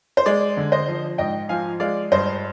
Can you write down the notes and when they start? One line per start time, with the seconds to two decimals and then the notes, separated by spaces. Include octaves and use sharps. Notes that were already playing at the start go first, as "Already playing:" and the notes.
0.17 C5
0.26 G#3 D5
0.57 D3
0.72 C5 D#5
0.88 F3
1.18 G#2 D#5 G5
1.49 F3 F5 G#5
1.80 G#3 D5 F5
2.12 G2 C5 D#5